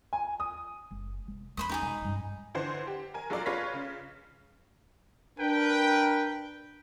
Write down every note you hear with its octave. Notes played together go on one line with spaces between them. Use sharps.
G#5
D#6
F#1
F1
E2 B5 C6 D#6
D#4 G4 G#4
B2
G2 C#4
D3 E3 C5 F#5
G4
A#4 G#5
F#3 G#3 F4 A4 A#4 D5
G#3 F4 B4 C#5 A#6 B6
C#3
D4 A#4 B4 G5